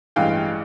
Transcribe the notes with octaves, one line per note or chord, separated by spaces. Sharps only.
A1 G2 E3 G#3 F5 G5